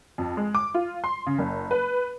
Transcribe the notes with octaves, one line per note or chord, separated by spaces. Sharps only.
F2
G#3
D6
F4
C6
C#3
F#1
B4